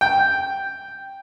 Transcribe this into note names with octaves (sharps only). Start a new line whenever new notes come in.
G5